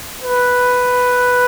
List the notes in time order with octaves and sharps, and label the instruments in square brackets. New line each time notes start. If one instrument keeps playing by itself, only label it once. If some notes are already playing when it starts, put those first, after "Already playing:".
[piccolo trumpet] B4